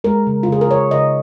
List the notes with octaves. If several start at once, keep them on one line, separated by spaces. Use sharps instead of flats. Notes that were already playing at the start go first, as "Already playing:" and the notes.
G#3 A#4
C#3
F4
C#3 G#4
A#4
C#3 C#5
C#3 D#5